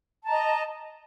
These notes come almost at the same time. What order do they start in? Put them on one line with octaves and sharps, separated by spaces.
A5 A#5 D#5